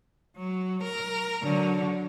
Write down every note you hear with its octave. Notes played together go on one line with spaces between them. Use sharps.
F#3
A#4
D3 F#3